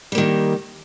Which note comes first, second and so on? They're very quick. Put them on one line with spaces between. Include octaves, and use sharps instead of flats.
G3 A#3 D#3